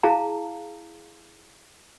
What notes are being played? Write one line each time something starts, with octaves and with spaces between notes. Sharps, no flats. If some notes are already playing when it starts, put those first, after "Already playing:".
E4 G#4 F5 A5 A#5